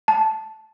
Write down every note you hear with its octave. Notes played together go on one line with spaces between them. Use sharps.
A5